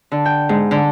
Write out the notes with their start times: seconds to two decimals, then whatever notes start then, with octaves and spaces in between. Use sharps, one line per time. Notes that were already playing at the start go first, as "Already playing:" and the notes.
0.11 D3
0.25 G5
0.49 G#2
0.71 D3